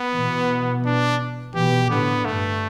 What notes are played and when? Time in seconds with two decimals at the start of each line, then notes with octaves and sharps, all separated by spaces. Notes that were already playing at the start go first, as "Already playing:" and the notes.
Already playing: B3
0.14 B2 E3
0.85 D4
1.54 B2 E3 G4
1.89 A2 D3 B3
2.24 G2 A3